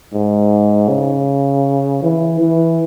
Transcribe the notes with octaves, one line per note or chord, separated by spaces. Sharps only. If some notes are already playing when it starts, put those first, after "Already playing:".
G#2
C#3
E3
E3